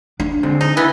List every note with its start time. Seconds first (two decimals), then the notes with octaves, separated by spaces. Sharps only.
0.20 D4
0.43 D3 G#3 C4
0.61 D#4
0.77 E3 B3